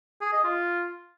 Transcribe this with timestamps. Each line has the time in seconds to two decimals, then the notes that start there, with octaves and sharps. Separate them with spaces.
0.21 G#4
0.33 D#5
0.44 F4